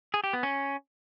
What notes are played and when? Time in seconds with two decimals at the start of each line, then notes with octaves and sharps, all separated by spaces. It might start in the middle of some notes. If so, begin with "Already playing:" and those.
0.14 G#4
0.24 G4
0.33 B3
0.43 C#4